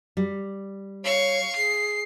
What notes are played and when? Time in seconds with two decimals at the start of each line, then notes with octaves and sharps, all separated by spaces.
0.17 G3
1.04 C#5 F5 C#6
1.56 G#4 C7